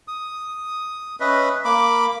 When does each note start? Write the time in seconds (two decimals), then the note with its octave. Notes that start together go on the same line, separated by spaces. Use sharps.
0.08 D#6
1.20 C#4 B4 D#5 E5
1.65 A#3 B5 D6